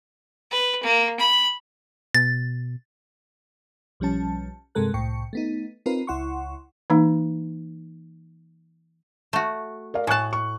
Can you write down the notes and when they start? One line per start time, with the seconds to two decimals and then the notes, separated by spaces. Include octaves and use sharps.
0.51 B4
0.83 A#3
1.19 B5
2.15 B2 A6
4.00 B1 F3 G3 C#4 A5
4.75 G2 C3 G#3 A4 A#4 F#6
4.94 C2 A2 G5 C#6 C#7
5.33 A3 B3 D#4
5.86 C4 D#4 F4 A#4 B4
6.07 C#2 E4 F#5 C6 C#6
6.90 E3 A#3 D#4
9.33 A3 F#4
9.94 A#4 D5 F5
10.07 A2 G#5 A5 C#6 F#6
10.33 C#6